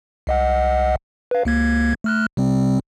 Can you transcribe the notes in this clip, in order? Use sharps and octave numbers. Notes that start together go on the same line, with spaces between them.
C2 D#5 F#5
B4 F5
C#2 A#3 G#6
A3 F6 F#6
C3 G3 C4